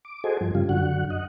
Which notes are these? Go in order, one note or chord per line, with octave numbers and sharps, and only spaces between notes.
D6
F#4 G#4 A4 C5 D#5 G#5
G2 F3
G2 C#3 G3 F4
F#2 D3 F#4 F#5
D#5 F#5